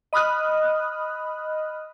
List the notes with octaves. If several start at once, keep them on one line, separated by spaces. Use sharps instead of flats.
D#5 B5 D#6 F6 F#6